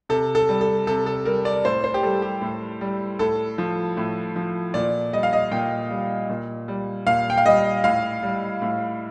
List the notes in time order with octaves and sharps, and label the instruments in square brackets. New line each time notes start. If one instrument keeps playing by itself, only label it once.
[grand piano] C3 A4
A4
G3
A4
C3 A4
A4
G3 A#4
D5
A2 C5
C5
G4
G3 A4
G4
A2
G3
A2 A4
F3
A2
F3
A#2 D5
G3 D#5
F5
D#5
A#2 G5
G3
A#2
G3
A#2 F5
G5
F5
G3 D#5
A2 F5
G3
A2